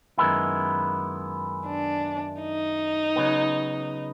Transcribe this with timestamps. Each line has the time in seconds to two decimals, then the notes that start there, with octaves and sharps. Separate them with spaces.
0.18 F#2 D#3 G#3 B3 E4
1.67 D4
2.42 D#4
3.16 C#3 F#3 B3